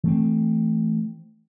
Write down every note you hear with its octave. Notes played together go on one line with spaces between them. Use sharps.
E3 A3 C4